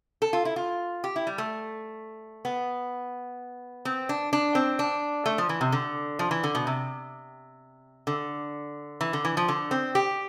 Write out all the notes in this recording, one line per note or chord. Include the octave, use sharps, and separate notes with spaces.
A4
F4
E4
F4
G4
E4
G3
A3
B3
C4
D4
D4
C4
D4
A3
F3
E3
C3
D3
F3
E3
D3
B2
C3
D3
E3
D3
E3
F3
D3
C4
G4